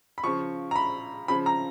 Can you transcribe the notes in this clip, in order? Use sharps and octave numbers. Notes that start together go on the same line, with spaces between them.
B5
C#3 F3 C#6
A#5
B5
C#3 F3 B5
A#5